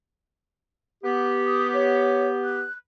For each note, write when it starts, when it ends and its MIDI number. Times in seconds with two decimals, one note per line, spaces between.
1.03 2.64 59
1.03 2.64 67
1.46 1.67 87
1.73 2.27 73
2.44 2.73 90